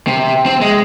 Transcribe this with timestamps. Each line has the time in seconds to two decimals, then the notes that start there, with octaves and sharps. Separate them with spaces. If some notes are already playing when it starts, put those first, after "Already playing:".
0.07 C3
0.46 C4
0.61 G#3